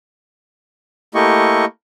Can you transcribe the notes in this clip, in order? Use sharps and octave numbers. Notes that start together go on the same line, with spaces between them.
A3 A#3 E4 G4 D#5 C#6